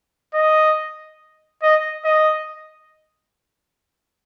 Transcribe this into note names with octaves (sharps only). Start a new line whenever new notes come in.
D#5
D#5
D#5